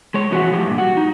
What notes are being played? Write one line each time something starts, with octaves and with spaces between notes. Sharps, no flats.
G#3 C#5
F2 E3 F#4 G#4 E5 F#5
A2 F3 G4
G2 A#2
F#4 F#5
D#4